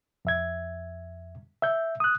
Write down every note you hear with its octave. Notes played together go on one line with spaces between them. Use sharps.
F2 E5 G#6
E5 G6
D#6 F#6